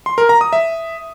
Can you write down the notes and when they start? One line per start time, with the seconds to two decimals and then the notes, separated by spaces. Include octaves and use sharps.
0.06 C6
0.18 A#4
0.29 A#5
0.41 D#6
0.53 E5